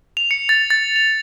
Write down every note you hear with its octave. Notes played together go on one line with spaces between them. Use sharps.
F7
C#7
A6
A6
F7